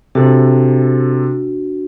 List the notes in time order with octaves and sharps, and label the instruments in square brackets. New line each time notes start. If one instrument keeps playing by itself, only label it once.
[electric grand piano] C3 A4 [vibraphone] D4 F#4